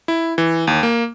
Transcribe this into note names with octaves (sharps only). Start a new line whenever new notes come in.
E4
E3
D#2
A#3